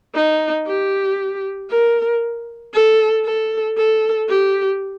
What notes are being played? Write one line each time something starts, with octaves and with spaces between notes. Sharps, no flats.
D#4
G4
A#4
A4
A4
A4
G4